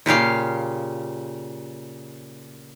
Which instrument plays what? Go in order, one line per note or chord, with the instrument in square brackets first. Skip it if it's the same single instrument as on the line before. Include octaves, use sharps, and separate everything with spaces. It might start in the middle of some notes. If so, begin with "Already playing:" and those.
[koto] A#2 C#3 G4 F5